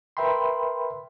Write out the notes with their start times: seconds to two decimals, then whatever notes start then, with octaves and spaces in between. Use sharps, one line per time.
0.17 A#4 B4 E5 G5 B5 C6